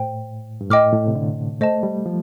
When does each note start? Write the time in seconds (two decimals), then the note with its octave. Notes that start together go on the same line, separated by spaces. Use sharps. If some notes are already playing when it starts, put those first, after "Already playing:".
Already playing: A2 C5 G5
0.61 G2
0.70 A2 D#5 G5 D6 F6
0.93 A2
1.07 C3
1.15 D3
1.61 A3 C5 D#5 A5
1.83 G3
2.06 F3